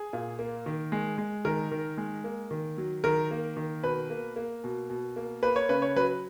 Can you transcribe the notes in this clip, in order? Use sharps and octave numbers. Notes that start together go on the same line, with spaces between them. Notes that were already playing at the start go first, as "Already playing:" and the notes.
Already playing: G#4
A#2
A#3
D#3
G#3
G#3
D#3 A#4
D#3
G#3
A#3
D#3
F#3
D#3 A#4
A#3
D#3
B2 B4
A#3
A#3
B2
B2
A#3
A#3 B4
C#5
C#3 B4
C#5
F#3 B4